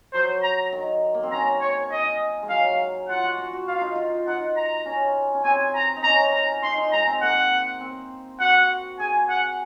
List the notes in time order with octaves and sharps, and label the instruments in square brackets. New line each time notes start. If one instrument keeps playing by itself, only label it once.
[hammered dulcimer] F#3 [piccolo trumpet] C5
[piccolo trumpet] A#5
[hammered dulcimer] D#3
A#3
C4
[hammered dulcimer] C#4 [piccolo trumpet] A#5
[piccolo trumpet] C#5
[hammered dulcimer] D#4 [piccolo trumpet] D#5
[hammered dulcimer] G#3
[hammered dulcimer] F#3 [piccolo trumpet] F5
[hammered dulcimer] F4 [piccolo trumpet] F#5
[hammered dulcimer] F#4
F#4
F#4
[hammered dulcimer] F4 [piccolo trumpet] F5
[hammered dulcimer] D#4
F4
[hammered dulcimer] D#4 [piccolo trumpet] F#5
[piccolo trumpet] A#5
[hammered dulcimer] C#4
C#4
[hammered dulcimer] C4 [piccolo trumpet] G#5
[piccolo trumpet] A#5
[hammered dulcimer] D#4
[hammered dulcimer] C#4 [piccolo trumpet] A#5
[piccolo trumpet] A#5
[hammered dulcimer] D#4 [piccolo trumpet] C6
[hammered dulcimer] D#4
[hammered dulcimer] G#3 [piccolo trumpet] A#5
[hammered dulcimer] C4
[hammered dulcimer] A#3 [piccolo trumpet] F#5
[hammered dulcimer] C4
[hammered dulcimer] F#4 [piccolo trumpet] F#5
[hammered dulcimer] G#4 [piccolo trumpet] G#5
[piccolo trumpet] F#5